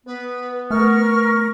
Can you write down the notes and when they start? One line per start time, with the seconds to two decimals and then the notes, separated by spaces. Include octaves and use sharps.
0.06 B3 B4
0.71 A3 A#4 C#6 F6